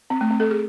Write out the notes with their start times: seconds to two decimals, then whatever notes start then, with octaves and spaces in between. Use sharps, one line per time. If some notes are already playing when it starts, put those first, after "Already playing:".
0.10 C4
0.21 A3
0.31 C4
0.40 A4
0.51 G#4